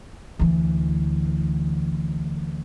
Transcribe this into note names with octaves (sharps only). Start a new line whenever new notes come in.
D2 E3